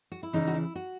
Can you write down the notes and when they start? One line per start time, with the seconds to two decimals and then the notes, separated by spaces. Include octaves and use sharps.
0.12 F#4
0.23 E4
0.33 E2 C#3 E3 D#4
0.47 F#4
0.54 E4
0.75 F#4